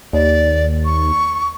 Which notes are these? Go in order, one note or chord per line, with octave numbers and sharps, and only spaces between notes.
D#2 D5
C#6